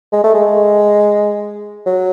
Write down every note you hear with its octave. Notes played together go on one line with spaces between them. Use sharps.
G#3
A3
G#3
F#3